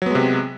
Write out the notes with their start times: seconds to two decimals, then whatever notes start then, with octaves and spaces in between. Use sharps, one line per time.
0.02 F#3
0.06 B3
0.11 G#3
0.15 C3